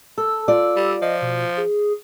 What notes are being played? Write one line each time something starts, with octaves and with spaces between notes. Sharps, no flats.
A4 E6
F4 D5
G3
F3 D#5
B2
G#4